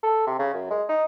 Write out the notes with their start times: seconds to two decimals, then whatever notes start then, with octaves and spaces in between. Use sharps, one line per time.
0.03 A4
0.27 C3
0.39 C#3
0.54 F#2
0.70 G#3
0.89 D#4